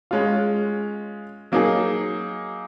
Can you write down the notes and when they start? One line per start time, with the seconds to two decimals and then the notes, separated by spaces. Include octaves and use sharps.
0.11 G#3 C#4 F4
1.52 F#3 A#3 D#4 G#4